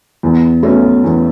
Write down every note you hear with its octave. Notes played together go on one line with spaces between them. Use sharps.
E2
B2 A3 C#4
E2